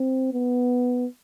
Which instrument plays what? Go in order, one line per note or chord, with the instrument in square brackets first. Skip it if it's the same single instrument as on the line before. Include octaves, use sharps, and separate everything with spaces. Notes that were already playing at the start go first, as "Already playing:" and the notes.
Already playing: [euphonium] C4
B3